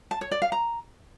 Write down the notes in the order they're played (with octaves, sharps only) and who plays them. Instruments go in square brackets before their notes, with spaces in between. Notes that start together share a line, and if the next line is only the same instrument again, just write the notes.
[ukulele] A5
C#5
D5
F5
A#5